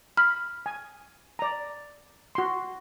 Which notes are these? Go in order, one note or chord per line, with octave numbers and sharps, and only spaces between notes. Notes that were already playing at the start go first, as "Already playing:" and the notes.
B5 F6
G#5
D5 A#5
F#4 C6